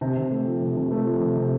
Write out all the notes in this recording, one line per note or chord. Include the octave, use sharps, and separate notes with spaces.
C3
C3
A3
F3
C3
C3
A3
F3
C3
C3